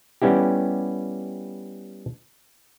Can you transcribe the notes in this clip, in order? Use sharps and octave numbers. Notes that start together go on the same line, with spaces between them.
G3 B3 C#4 E4 G4